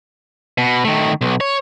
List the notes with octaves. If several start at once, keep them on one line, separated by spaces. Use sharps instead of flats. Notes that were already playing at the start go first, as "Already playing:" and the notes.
B2
D#3 A3
B1
C#5